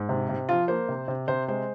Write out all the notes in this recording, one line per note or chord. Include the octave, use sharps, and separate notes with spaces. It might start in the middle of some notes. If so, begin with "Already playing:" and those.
Already playing: G#2
C3
C3
F3 F4
A#3 C5
C3
C3
C3 C5
G#3 C5